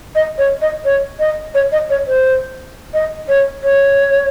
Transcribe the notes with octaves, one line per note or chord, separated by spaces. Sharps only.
D#5
C#5
D#5
C#5
D#5
C#5
D#5
C#5
C5
D#5
C#5
C#5